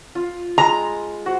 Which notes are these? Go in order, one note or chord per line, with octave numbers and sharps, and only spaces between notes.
F4
G#3 A#5
F#4 C5